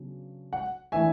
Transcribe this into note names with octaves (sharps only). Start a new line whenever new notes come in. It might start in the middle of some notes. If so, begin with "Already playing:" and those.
Already playing: C#3 F#3 B3 D4
F#5
E3 A3 D4 E5 G#5